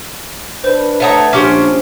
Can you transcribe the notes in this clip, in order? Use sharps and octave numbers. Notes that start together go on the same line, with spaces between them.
D4 B4 C5
A3 C#5 E5 F#5 A#5 D#6
A#1 C#4 D4 G4 C5 D6 B6